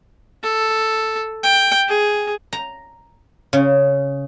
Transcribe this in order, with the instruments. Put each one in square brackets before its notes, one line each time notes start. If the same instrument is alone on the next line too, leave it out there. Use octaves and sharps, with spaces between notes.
[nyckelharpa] A4
G5
G#4
[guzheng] A#5
C#3